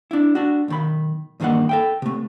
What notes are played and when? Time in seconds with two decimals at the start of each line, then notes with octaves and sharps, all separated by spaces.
0.11 D4 E4
0.35 D4 F#4
0.68 B1 D#3 B5
1.40 E2 G2 D#3 A#3 D#5 F#5
1.69 A4 E5 G5
2.02 C3 A3